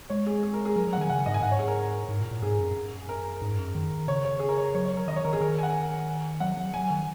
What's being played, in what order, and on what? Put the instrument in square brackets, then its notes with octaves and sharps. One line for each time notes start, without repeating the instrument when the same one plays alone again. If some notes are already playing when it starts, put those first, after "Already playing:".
[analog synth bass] G#3 [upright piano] C#5
[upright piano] G#4
G#4
A#4
G#4
[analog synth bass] F#3 [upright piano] A#4
[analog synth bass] F#3
[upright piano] F#5
[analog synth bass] D#3 [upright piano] G#5
[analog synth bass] C#3 [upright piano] F#5
[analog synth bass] G#2 [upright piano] D#5
[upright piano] G#5
[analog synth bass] G#2 [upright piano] F#5
[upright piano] C#5
G#4
A#4
[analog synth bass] G#2
A#2
A#2
[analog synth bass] G#2 [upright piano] G#4
[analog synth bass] F#2
[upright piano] A#4
[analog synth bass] G#2
F#2
D#3
[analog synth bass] C#3 [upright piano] C#5
[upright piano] C#5
G#4
A#4
C#5
[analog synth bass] F#3 [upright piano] C#5
[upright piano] C#5
A#4
[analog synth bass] D#3 [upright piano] D#5
[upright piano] C#5
[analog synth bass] D#3 [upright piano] A#4
[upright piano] G#4
[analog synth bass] D#3 [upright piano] A#4
[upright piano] G#5
F#5
[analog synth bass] F#3 [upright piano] F#5
[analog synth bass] F#3
[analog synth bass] F#3 [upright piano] G#5
[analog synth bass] D#3